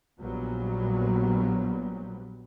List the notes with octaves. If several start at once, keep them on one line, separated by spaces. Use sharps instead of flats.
A#1 A#2 F#3 G3 B3